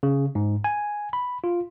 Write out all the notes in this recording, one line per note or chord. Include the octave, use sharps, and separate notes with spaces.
C#3
G#2
G#5
B5
F4